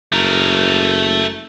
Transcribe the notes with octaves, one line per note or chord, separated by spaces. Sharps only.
F#1 A3 A#4